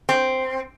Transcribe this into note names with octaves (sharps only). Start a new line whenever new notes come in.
C4